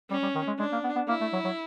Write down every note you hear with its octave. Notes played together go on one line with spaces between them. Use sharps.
G3 C#4
G3
D#3
G#3
G#3 D4
A#3
B3
B3
A#3 E4
A3
F#3
F#3